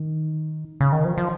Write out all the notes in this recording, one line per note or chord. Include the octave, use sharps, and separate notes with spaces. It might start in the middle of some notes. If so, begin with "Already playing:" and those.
Already playing: D#3
C#3
D#3
F3
F3